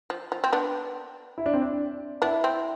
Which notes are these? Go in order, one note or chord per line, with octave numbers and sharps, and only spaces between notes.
F3
F3
C4
B3 D4
E4
D4
C4
D4
B3 D4 E4
C4